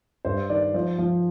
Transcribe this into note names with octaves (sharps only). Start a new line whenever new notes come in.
G2 C5
D#3 D5
F3 C5
F3